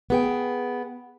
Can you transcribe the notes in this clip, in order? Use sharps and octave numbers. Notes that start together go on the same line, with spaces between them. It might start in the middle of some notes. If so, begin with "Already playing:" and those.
B3 G#4 G5